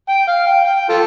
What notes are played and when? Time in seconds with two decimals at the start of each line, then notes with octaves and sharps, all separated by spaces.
0.09 G5
0.28 F5
0.46 G5
0.65 G5
0.89 F4 A4